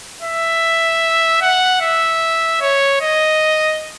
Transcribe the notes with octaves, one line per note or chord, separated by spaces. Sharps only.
E5
F#5
E5
C#5
D#5